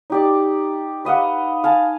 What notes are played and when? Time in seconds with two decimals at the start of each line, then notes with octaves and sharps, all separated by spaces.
0.10 D#4 G4 D5
1.05 B4 D#5 F5 F#5
1.64 F5 G#5 A5